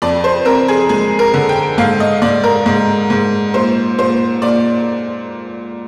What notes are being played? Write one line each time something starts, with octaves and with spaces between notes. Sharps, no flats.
F2 D5
C5
C4 A#4
G#4
G#3 G#4
A#4
D3
G5
G#2 F5
D#5
G#2 D5
A#4
G#2
G#2
A#2 C5
A#2 C5
A#2 D5